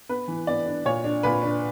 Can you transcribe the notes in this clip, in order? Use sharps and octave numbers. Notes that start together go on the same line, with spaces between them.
B3 B4
E3
B3 D5
D4
A#2 C#5
D4
A#2 B4
D4